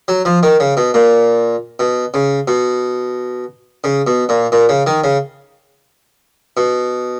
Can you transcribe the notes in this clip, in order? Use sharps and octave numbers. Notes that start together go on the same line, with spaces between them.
F#3
F3
D#3
C#3
B2
A#2
B2
C#3
B2
C#3
B2
A#2
A#2
C#3
D#3
C#3
B2